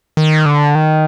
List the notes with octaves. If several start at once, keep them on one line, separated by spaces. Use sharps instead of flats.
D#3
D3
D#3